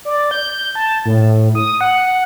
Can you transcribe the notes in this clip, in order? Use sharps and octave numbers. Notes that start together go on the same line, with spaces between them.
D5
G6
A5
A2
D#6
F#5